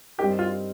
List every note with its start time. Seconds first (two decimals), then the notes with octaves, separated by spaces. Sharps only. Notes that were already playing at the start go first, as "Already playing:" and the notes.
0.18 G2 G3 C4 D#4 G4 A#4
0.39 F4